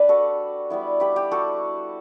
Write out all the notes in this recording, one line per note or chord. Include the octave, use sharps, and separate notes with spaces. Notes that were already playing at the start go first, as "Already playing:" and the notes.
Already playing: G3 D4 B4 D5
F#4 A4
G3 B3 E4
G4 B4
G4
F#4 A4